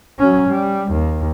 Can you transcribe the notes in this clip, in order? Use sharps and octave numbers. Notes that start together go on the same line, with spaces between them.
F#3 C#4
G3
D#2